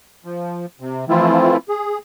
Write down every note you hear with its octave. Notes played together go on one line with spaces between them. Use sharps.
F3
C3
E3 F3 A3 C4 E4 F4
G#4